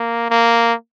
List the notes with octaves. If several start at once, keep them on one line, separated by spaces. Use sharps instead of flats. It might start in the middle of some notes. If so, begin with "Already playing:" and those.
Already playing: A#3
A#3